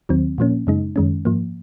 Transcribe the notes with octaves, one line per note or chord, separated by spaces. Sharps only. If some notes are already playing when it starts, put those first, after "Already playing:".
D#2 D#3 F#3 C4
A#2 F3 A#3 C#4
F#2 C#3 G#3 D#4
F#2 D#3 G#3 C#4
G#2 F3 A#3